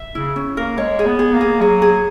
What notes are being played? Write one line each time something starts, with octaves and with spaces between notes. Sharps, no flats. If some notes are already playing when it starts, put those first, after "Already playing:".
Already playing: E5
C#3 E4
C#4
A#3 A#4
G#3 C#5
G#4
B3
G#4
A#3
G#4
F#3 G#4
G#4